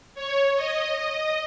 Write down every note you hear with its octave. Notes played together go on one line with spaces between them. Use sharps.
C#5
D#5